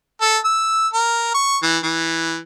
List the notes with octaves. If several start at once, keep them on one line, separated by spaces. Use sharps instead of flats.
A4
E6
A#4
C#6
E3
E3